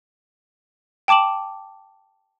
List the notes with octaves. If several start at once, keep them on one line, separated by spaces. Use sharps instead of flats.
G5 A5 D6 E7 F#7